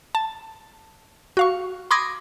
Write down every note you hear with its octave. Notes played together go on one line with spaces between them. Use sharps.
A5
F#4 F5 C#6
B5 C6 D6 D#6 G#6 A#6